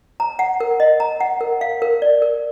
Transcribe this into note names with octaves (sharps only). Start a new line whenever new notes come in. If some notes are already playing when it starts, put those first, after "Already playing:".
A#5
F#5
A#4
D#5
A#5
F#5
A#4
F5
A#4
D5
A#4